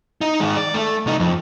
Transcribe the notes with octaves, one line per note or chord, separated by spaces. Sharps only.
D#4
D#3 G#3
D5
A3
C2 D#4
F2